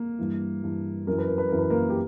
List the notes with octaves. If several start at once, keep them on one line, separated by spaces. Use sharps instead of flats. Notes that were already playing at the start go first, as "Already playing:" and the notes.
Already playing: A#3
G2 E3
G2 E3
F#2 E3 A#4
B4
A#4
B4
F#2 E3 A#4
B4
A#3 A#4
G4